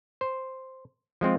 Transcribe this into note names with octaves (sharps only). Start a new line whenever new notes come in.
C5
F3 G#3 C4 F4